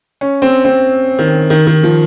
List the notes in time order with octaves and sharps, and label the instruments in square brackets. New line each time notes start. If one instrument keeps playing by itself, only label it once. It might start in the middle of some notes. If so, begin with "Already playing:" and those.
[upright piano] C#4
C4
C4
D#3
D#3
D#3
F3